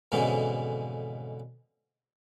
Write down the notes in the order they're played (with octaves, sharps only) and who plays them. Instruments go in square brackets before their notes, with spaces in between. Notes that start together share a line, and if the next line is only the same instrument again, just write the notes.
[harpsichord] F2 G#2 B2 D3 E3 C#4